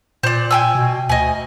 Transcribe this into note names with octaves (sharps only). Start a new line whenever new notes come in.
A#2 C5 D5
G5 G#5 E6
B2
D2 D#5 G#5